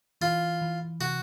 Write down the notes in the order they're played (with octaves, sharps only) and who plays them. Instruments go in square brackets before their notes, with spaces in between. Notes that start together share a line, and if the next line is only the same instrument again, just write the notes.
[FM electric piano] E3 [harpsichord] F4
[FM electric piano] E3
[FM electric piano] C3 [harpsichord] F#4